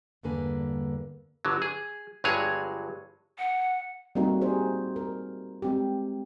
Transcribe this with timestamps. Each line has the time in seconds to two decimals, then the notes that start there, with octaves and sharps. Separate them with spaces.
0.23 E2 G2 D3 A#3 B4 G#5
1.45 G1 D3 F#3
1.62 G#4
2.24 G1 G2 F#3 G#3 G#4 C#5
3.39 F#5
4.15 G3 A3 A#3 C4 D#4 F#4
4.41 G4 G#4 C5
4.96 A#4
5.62 G#3 C4 G4